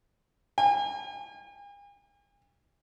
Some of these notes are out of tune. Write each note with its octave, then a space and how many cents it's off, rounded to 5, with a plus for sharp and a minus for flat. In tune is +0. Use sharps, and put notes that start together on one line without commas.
G#5 -45